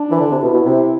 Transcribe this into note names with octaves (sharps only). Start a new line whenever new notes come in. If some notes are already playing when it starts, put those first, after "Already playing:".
Already playing: D4
E3
D3
C3
B2 E4
B2
C3